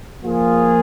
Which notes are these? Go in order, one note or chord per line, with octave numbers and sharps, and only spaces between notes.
F3 A#3 F4 G#4